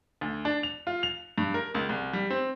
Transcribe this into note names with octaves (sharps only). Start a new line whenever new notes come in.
D2
D4
F7
F4
F7
G2
A#4
C#2
C2
G3
C4